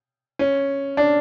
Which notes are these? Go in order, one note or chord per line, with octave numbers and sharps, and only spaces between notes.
C#4
D4